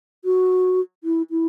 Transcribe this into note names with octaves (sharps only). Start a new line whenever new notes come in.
F#4
E4
E4